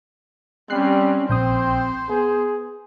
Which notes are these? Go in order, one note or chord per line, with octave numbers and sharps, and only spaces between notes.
G3 C4 C#4 F#6 C7
A#1 C4 C5 G5 D#6
B3 G#4